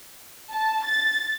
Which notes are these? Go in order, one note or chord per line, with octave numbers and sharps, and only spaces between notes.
A5
A6